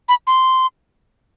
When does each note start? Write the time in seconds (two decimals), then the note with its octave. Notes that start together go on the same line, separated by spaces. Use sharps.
0.09 B5
0.27 C6